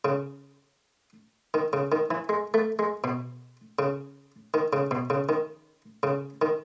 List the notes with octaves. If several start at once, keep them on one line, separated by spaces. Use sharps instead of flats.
C#3
D#3
C#3
D#3
E3
G#3
A3
G#3
B2
C#3
D#3
C#3
B2
C#3
D#3
C#3
D#3